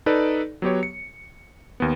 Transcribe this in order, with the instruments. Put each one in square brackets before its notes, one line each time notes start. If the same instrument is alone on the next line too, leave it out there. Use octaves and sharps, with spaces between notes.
[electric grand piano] D#4 A4 B4 D5
F#3 B3 G4 C#5
C#7
D#2 B3